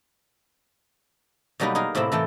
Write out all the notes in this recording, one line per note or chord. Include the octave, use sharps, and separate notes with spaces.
B2 F#3 G3 A#3 D#4 B4
D#4 G#4 A#4
A2 C3 A#3 C4 E4
A2 E3 A4 G5